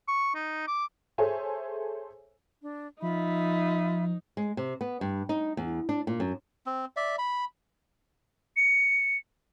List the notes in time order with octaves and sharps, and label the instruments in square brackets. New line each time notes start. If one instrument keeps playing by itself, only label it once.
[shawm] C#6
D#4
D6
[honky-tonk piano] G#4 A4 C5 C#5 E5 G#5
[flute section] D4
[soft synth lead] F3 [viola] D#4 [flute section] F4 E5 B5
[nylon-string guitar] G#3
C3
B3
G2
D#4
E2
D4
A#2
F#2
[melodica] C4
D5 E5
B5
[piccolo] C#7